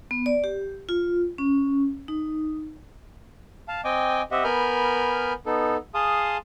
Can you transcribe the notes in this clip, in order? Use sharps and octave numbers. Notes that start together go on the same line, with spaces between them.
B3
D5
G4
F4
C#4
D#4
F5 A5
C4 D#5 G5 G#5 D6
C4 G4 D#5 E5 F#5
B3 A#4 G#5 B5 F6 G6
B3 D#4 A4
G#4 F5 A5 C6 D#6